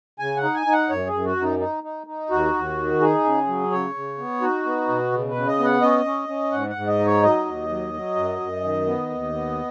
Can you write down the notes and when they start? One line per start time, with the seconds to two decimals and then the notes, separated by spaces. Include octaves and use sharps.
0.19 C#3 G#5
0.37 F#5
0.43 D#4
0.54 G#5
0.66 D#4
0.72 F#5
0.90 F#2 C#5
1.07 G#4
1.13 F#2
1.25 F#4
1.36 F#2
1.42 D#4
1.59 D#4
1.84 D#4
2.07 D#4
2.31 D#2 F#4
2.54 D#2
2.78 D#3
3.01 D#4 G#4
3.25 C#3
3.47 F#3
3.71 C#3 C#5
3.94 C#3
4.18 B3
4.41 D#4 F#4
4.65 B3
4.88 B2
5.12 C#3
5.29 B4
5.35 C#3
5.47 D#5
5.59 B3
5.64 F#5
5.81 C#4 D#5
6.05 C#4
6.28 C#4
6.52 G#2 F#5
6.69 F#5
6.76 G#2
6.87 D#5
6.99 D#4
7.06 C#5
7.23 F#3 D#5
7.46 D#2
7.69 F#3
7.93 F#3
8.16 F#2
8.40 F#2
8.63 D#3
8.86 B3
9.10 D#2
9.33 B3